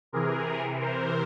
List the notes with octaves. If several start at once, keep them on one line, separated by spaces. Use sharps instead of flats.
C3 E3 G#4 A#4
A#4 C5